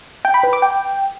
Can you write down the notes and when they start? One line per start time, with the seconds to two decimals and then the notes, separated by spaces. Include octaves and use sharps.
0.25 G5
0.34 B5
0.43 B4
0.53 D6
0.62 G5